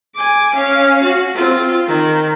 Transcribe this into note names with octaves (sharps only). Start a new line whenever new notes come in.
G#5 D6
C#4 F5
F#4
C4 F4
D#3